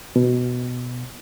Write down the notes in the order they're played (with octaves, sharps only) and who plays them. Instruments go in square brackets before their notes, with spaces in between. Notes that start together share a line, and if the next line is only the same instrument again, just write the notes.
[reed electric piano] B2